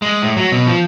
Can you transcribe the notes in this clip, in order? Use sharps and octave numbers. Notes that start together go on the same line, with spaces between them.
G#3
A2
F#3
B2
F3